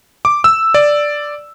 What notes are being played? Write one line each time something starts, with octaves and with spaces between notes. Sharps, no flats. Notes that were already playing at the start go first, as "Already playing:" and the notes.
D6
E6
D5